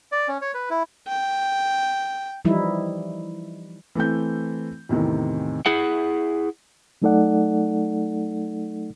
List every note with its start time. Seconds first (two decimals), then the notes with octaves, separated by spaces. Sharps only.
0.12 D5
0.28 C#4
0.41 C#5
0.54 B4
0.70 E4
1.08 G5
2.45 E3 F3 G3 D#4 E4
3.95 E3 A3 C4 G6
4.89 E2 A2 C3 D#3 C4
5.66 E4 G#4 F#5
7.02 F#3 A3 D#4 A4 D5 F#5